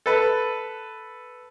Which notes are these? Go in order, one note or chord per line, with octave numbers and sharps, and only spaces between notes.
A4 B4